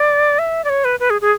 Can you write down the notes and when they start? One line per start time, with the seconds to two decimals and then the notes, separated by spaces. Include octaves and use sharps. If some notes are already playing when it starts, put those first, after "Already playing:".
Already playing: D5
0.39 E5
0.64 D5
0.69 C#5
0.85 B4
1.00 B4
1.10 G#4
1.21 G#4